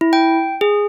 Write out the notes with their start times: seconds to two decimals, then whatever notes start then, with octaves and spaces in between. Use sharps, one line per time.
0.01 E4
0.13 G5
0.61 G#4